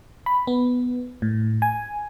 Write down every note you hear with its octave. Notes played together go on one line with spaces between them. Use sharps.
B5
B3
A2
G#5